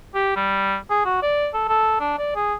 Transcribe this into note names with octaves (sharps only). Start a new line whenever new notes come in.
G4
G3
G#4
F#4
D5
A4
A4
D4
D5
G#4